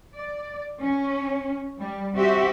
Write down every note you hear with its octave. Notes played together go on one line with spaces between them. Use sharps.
D5
C#4
G3
C4 F#4 G4 E5